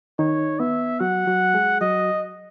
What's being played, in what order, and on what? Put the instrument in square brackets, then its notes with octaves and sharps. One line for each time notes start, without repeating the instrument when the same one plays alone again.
[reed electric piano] D#3 D#4 [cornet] C#5
[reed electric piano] B3 [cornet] E5
[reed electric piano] F#3 F#4 [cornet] F#5
[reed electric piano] F#3 F#4
G#3 G#4
[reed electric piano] F#3 F#4 [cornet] D#5